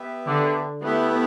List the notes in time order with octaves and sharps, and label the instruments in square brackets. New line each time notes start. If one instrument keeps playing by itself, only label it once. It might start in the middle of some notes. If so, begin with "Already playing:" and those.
Already playing: [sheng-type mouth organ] B3 G4 B4 E5
[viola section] D3 D4
[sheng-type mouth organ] A3 E4 G4 E5 [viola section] B3